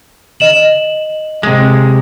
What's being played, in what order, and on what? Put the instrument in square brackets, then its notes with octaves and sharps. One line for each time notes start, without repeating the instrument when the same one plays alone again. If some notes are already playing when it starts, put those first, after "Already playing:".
[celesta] D#5 E7 F#7
[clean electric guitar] C3 G#3